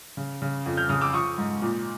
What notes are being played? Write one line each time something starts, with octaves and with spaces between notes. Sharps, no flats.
C#3
C#3
F2
F6 G6
C#3 D#6 F6
D6 E6
F3 C#6 D#6
G#2
A#2